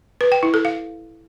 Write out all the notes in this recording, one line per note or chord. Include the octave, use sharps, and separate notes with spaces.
B4
G5
E4
A4
F5